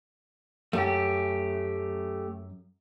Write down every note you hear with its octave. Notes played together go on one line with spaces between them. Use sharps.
F#2 A3 G4